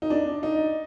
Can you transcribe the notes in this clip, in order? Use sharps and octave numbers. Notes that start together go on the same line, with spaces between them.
D#4
D4
D#4